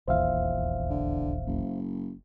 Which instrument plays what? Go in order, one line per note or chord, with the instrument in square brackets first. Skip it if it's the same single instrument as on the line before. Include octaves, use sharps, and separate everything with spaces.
[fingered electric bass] D#1 A#1 E2 [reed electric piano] C5 E5 F5
[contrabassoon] D3
F#1